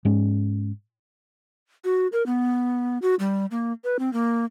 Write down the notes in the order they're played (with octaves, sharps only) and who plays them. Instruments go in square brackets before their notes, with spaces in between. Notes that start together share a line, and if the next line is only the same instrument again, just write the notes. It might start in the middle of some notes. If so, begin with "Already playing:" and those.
[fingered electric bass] G#2 G#3 C#4
[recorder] F#4
A#4
B3
F#4
G3
A#3
B4
C4
A#3